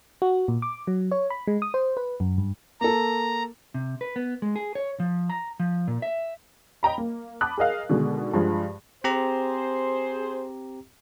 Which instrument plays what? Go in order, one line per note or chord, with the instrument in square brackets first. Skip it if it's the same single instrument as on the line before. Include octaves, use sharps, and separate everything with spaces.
[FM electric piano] F#4
A#2
D6
F#3
C#5
B5
G#3
D#6
C5
B4
F#2
G2
[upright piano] A#3 A4 [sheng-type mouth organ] A#5
[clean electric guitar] C3
B4
B3
G#3
G#4
C#5
F3
A#5
F3
A#2
E5
[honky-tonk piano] D#5 G5 A#5 B5
A#3
A5 B5 D6 D#6 F#6
G#4 A#4 D#5 F5
B2 D3 D#3 G#3
G2 F3 G#3
[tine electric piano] C4 G4 A#5 [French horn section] G#4 C5